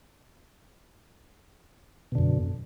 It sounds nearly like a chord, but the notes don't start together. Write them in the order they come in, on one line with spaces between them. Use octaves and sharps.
B2 D3 F#2